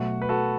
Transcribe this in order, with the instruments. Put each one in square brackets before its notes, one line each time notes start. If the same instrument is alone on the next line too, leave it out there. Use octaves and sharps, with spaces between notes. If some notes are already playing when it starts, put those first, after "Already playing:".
Already playing: [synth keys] B2 F#3 A3 [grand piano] F#4
[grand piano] B4
F#4 A4